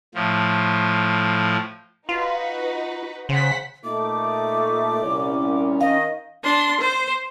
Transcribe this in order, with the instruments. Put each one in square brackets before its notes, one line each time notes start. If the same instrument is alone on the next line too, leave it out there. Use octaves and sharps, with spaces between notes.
[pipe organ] A2 F3
[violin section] D#4 F#4 B4 [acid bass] F4
[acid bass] C#3 [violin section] C5 F#5 B6
[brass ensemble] A#2 A3 D#4 [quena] D6
[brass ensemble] C2 A#2 [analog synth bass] C#4
[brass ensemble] D#3 [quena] D#5 [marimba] F5
[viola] D4 C6
C5